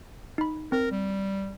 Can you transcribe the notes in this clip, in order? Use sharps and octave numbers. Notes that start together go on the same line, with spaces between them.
D#4 B5
C4 A#4
G3